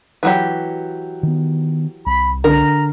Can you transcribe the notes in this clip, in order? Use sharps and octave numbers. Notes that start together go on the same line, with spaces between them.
E3 F#3 G4
D#3 B3
C2 B5
D3 A#4 A#5